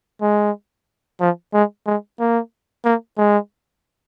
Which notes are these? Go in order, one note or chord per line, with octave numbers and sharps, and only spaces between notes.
G#3
F3
G#3
G#3
A#3
A#3
G#3